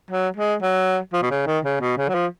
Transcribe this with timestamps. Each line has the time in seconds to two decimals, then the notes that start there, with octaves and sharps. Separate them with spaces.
0.11 F#3
0.37 G#3
0.62 F#3
1.13 F3
1.22 B2
1.30 C#3
1.47 D#3
1.65 C#3
1.81 B2
1.97 C#3
2.08 F#3
2.14 F3